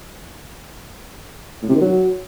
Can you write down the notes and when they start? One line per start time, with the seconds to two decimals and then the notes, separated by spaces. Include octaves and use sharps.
1.63 A2
1.69 C3
1.75 D#3
1.81 F#3